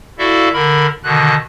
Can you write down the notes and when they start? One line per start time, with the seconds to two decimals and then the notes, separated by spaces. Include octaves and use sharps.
0.19 E4 F#4 A4 D5 E5 F5
0.53 D3 A#4 B5
1.03 B2 D3 D#3 F#6